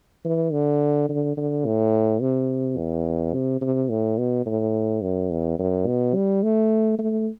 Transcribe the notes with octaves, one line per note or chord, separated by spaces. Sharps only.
E3
D3
D3
D3
A2
C3
E2
C3
C3
A2
B2
A2
F#2
E2
F#2
B2
G3
A3
A3